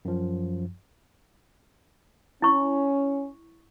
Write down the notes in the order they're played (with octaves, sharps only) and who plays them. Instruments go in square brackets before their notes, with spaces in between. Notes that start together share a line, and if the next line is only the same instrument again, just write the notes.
[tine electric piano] F#2 F3
[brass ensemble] C#4 [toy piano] E4 C#6